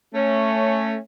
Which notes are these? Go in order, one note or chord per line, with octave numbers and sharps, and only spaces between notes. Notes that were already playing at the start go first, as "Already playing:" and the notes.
A3 C#4